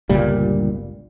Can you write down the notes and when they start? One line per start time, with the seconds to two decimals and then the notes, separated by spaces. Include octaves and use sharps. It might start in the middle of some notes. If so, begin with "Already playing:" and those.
0.09 G1 C#2 A#2 G3